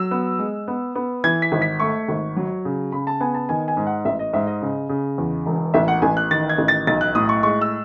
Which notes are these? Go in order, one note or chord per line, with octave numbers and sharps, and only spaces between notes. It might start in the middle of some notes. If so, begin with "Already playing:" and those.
Already playing: F#3 E6
B3
G#3
B3
B3
E3 G#6
B6
G#1
B6
A3 C#6
G#1
F#3
C#3
C#3 B5
A5
B3 G#5
A5
D#3 G#5
G#5
G#2
F#5
A1 E5
D#5
G#2 E5
D#5
C#3
C#3
E2
E1
A1 E5
F#5
A1 G#5
F#6
D#3 A6
G#6
A1
A6
B1 A6
F#6
A2 D#6
C#6
G#3 C#6
E6